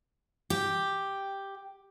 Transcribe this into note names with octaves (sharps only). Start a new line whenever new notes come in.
G4